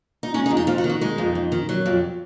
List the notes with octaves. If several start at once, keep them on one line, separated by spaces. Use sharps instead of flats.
D#4
G#3 C#4
D#4
F2
D#4
F2 F4
F#4
D#3
F#4
G#3 D#4
F2
F2
D#3
F#3
F2